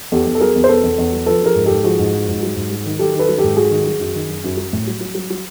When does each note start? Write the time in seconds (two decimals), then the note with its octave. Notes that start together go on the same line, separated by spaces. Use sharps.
0.12 E2 G4 A4
0.27 E2
0.35 A4
0.41 F#3 G#4 A#4
0.56 E2
0.64 C5
0.69 B2 A4 B4
0.83 E2
0.98 E2
1.12 F#3
1.26 F3 A4 B4
1.42 F3 G#4 A#4
1.55 G#2
1.66 G#2 G4 A4
1.84 F3 F#4 G#4
1.99 G#2
2.14 F3
2.28 G#2
2.43 F#3
2.56 G#2
2.71 F#3
2.86 D#3
2.99 F#3 G4 A4
3.14 D#3
3.19 A4 B4
3.29 F#3
3.38 G#2 G4 A4
3.57 F#3 F#4 G#4
3.71 D#3
3.86 F#3
4.00 F#2
4.15 D#3
4.29 F#2
4.44 F#2
4.57 F#3
4.73 A2
4.87 F#3
5.01 F#3
5.15 F#3
5.30 F#3